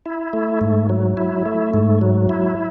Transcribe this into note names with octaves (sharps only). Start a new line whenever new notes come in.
E4
A3
G#2
F#3
E4
A3
G#2
F#3
E4